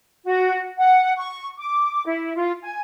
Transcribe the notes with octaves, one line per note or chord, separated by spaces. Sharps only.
F#4
F#5
C#6
D6
E4
F4
G#5